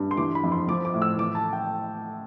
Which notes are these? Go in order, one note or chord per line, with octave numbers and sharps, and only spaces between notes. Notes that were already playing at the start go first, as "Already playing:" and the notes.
Already playing: G2
C6
E3 D6
B5
F2
C6
F3 D6
D6
A2
E6
E3 D6
A5
G5